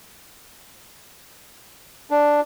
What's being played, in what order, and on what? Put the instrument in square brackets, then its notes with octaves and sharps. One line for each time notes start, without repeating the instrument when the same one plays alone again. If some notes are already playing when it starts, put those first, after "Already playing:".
[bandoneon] D4